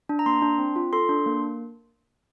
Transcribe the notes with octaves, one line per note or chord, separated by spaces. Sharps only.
D4
A#5
A#3 C6
D4
C4
F4
A4 C6
D4
A#3